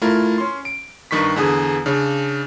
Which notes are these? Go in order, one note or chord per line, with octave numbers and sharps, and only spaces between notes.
A3 E4 F4 A#4
C#4 C6
D7
G2 D#3 C#6 B6
E2 D3 G#4 D#6
C#3 D4